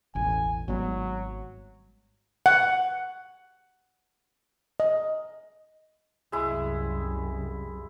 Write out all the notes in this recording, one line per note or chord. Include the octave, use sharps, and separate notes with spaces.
E1 A1 G#5
G#1 F#3 G3 B3
F#5
D#5
C2 F#2 G#3 E4